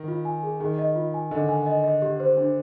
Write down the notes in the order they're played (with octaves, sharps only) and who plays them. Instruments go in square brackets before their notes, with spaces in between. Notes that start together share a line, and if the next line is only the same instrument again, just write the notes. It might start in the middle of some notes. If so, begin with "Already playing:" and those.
Already playing: [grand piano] D#3
[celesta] F4
G#5
G#4
[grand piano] D#3 [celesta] G#4
[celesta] D#5
F4
G#5
[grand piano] D3 [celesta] D#5
[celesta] G#5
D#5
D#5
G4
C5
D4